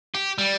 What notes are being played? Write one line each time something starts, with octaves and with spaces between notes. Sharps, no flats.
G4
G3